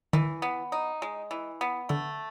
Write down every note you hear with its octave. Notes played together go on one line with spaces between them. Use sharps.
D#3 E3
B3
D#4
G#3
E3
B3
D3 A3